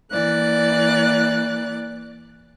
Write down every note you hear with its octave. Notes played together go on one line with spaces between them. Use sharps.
E3 A#3 D5 F#6